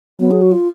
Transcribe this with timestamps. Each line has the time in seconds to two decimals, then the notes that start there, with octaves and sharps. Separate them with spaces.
0.20 F#3 B3
0.31 G#4
0.42 F#4
0.52 F4